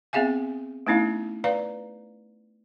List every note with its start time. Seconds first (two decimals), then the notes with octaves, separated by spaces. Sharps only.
0.13 B3 C4 G#4 E5 F5 G#5
0.87 A3 B3 C#4 D#4 E4 F5
1.44 B4 D5 F5 A#5